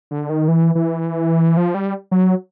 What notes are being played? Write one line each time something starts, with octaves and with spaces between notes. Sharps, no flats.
D3
D#3
E3
E3
F3
G3
F#3